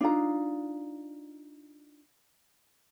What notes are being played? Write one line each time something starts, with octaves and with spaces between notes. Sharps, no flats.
D4 D#4 F4 A#5